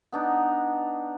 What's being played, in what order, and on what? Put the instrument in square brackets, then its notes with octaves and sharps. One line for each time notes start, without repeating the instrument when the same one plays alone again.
[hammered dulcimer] B3 D4 D#4